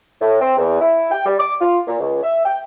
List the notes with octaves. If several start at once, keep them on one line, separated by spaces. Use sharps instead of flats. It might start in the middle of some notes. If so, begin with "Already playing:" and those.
A2
C4
E2
E4
G5
G3
D6
F4
A#2
C#2
E5
G5